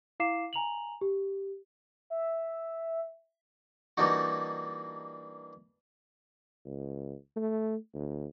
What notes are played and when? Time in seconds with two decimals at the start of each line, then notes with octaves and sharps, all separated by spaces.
0.20 E4 F5 D6 C7 E7
0.53 G#5 A#5 F7 F#7
1.01 G4
2.10 E5
3.97 E3 G3 A#3 D4 D#4 F#4
6.65 C#2
7.36 A3
7.94 D2